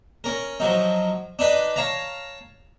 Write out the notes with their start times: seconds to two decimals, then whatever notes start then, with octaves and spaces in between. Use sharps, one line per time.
0.24 C#4 A#4
0.60 F3 F#3 D#4
1.39 D4 D#4 B4 B5
1.76 C#5 F5 A5 A#5